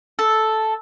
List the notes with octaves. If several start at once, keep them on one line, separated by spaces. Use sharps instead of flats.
A4